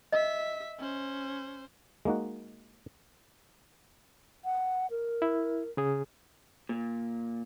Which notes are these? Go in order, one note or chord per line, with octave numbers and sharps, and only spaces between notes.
D#5 E5 B6
C#4 C5
G#3 A#3 D#4 F#4
F#5
A#4
E4
C#3 G#4
A#2